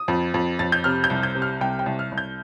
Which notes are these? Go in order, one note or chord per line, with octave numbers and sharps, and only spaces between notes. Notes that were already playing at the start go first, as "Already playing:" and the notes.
Already playing: D#6
F2
F2
F2 A6
G6
C3 F6
G6
C2
G6
C3
F6
C2 G5
G5
C2
F6
C2
G6